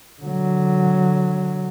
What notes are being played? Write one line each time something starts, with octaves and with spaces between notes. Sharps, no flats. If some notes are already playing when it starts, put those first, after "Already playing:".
D3 F#3